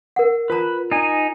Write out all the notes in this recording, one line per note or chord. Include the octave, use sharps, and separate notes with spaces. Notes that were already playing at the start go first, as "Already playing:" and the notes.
A#4 F#5
F4 B4 A5 A#5
D#4 G#5